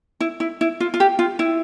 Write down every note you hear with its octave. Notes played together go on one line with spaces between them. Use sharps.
E4
E4
E4
F4
F4
G4
F4
E4